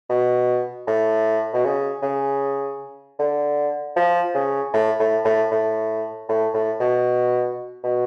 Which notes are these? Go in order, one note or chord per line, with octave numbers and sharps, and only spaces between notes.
B2
A2
B2
C#3
C#3
D3
F3
C#3
A2
A2
A2
A2
A2
A2
B2
B2